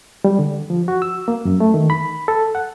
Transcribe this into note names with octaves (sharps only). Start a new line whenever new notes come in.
G3
D3
F3
F#4
E6
A#3
F#2
A3
D#3
B5
A4
F#5